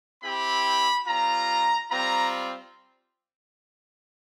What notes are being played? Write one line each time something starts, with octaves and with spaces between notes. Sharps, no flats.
C4 E4 G4 B5
G3 C4 F4 A#5
G3 C4 F4 A#5